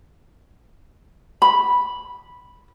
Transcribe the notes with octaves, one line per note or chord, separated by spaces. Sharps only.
B5